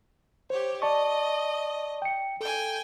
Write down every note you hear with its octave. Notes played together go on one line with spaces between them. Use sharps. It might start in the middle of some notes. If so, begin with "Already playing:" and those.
G4 C5 C#5
D5 D#5 A5 C#6
G5 C#7
A4 G5 G#5